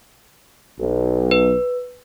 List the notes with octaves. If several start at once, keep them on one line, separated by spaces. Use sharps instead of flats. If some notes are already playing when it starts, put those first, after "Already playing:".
B1
B4